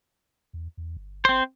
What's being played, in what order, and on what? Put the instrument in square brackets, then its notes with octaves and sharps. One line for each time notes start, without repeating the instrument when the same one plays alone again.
[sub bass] E2
E2
G1
[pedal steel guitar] C4 C5